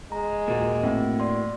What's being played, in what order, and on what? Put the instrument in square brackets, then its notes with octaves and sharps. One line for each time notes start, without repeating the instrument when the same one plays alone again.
[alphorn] G#3 [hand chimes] A#5
[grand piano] D#2 A#2 [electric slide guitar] A#3 F#4
[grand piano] A2 [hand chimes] C4
[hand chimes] D5 C6